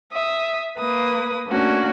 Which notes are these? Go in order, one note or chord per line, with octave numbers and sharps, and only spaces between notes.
E5 D#6
A#3 B4 D#6
A3 A#3 C#4 D4 F#4